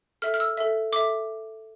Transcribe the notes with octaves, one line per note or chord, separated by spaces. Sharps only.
A4 E5 F6
F6
E6
A4 E5
A4 E5 D6